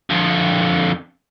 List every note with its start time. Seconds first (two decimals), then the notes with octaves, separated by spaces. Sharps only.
0.10 F2 D3